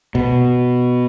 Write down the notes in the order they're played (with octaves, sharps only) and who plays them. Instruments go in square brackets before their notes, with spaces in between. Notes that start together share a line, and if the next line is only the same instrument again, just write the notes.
[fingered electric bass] B2